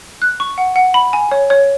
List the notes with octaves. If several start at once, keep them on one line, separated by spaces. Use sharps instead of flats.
F#6
C#6
F#5
F#5
B5
G#5
C#5
C#5